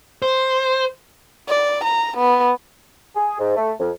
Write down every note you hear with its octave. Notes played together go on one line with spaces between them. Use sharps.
C5
D5
A#5
B3
G#4
G#2
A3
F2